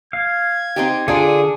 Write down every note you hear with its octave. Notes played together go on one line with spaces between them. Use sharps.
F5 G#6
C4 D#4 G4
D3 D4 F4 G#4 G#5